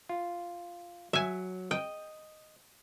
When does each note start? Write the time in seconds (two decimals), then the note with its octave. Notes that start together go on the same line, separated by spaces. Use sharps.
0.09 F4
1.13 F#3 E5 G#5
1.71 D#5 G5